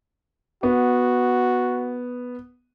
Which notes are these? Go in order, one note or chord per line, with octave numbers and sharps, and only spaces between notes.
B3 F#4